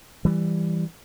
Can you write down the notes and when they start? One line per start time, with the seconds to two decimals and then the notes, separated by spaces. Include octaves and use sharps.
0.25 E3 G3